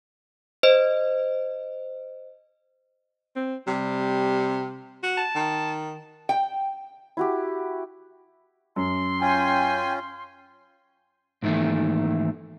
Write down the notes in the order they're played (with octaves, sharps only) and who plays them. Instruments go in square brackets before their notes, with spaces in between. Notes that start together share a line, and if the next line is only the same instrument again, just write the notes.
[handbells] C5 D#5
[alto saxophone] C4
[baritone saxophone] C3 [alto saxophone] G3
[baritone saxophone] F#4
[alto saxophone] A5
[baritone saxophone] D#3
[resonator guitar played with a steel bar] G5
[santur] E4 F#4 G4
[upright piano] F#2 [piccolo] C6
[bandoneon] C#4 F4 [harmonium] G5 G#5
[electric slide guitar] G#2 D#3 E3 A3 A#3